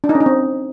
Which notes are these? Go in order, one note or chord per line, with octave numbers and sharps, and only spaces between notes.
D4
D#4
C#4
D#4
C4